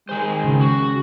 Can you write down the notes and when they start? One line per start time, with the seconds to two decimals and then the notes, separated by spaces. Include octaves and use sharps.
0.09 D#3 G#3 C5
0.44 C#3
0.61 F#4